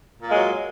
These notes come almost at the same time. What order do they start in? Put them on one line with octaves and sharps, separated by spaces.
A#2 A#3 G#3 F#3